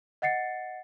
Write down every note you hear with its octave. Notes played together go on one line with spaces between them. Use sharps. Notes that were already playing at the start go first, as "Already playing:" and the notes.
D#5 F#5 A6 C7 C#7